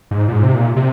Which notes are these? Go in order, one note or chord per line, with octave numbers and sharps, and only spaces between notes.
G#2
A#2
G#2
C3
A#2
C3